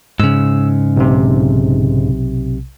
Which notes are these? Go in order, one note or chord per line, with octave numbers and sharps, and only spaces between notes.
G#2 C#3 E6
B1 C3